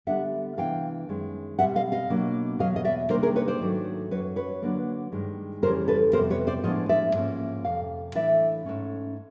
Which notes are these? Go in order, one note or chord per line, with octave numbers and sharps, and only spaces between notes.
D3 G3 B3 D4 E5 F#5
C3 E3 G#3 B3 D4 F5 G5
F#2 D#3 G#3
B2 G3 C4 E5 F#5
D#5 F5
D#5 F5
B2 F#3 A#3 D4
E2 B2 F#3 D#5 F5
D#5
D5 E5
C3 D#3 G3 A#3 D4 A#4 C5
G#4 A#4
B4 C#5
C5 D5
G#2 D#3 F#3 A3 D4
F#2 C#3 F#3 B4 C#5
B4 C#5
D3 F#3 A#3 D4
G2 D#3 G#3
F2 C#3 E3 G3 A#4 C5
A4 B4
F2 C3 F3 G#3 B3 A#4 C5
B4 C#5
C5 D5
A2 F3 G#3 B3 D4 C#5 D#5
D5 E5
G#2 F3 A#3 C#4
F2 C3 F5
A2 E3 A3 D4 D5 E5
G#2 E3 A3 C#4